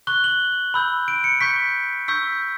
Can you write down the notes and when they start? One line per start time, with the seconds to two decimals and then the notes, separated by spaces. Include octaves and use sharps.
0.07 C#6 F#6 G7
0.24 F#7
0.74 B5 E6 G6
1.08 D7
1.24 C#7
1.41 C#6 G6 B6
2.08 C#6 E6 G6 B6